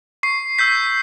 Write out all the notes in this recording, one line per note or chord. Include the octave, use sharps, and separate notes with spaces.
C#6 C7
E6 G6 B6